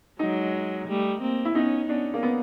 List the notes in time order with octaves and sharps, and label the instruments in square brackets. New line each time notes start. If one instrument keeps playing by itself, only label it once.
[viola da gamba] F#3 G#3 [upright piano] D#4
[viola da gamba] G3 A3
A#3 C4
[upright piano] E4
[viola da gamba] B3 C#4 [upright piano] D#4
[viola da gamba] B3 C#4 [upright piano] D4
[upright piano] A#3
B3